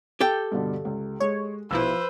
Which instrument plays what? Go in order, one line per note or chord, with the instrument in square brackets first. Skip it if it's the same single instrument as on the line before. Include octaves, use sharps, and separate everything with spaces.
[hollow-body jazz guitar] G4 A4 G5
[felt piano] G2 B2 D3
C#2
[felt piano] G#3 [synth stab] C#5
[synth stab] A#1 B2 E4 [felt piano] F3 E6 [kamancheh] B4 C5